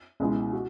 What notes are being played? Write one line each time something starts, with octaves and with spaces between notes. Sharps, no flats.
C#2 B2 G#3 E4
F#4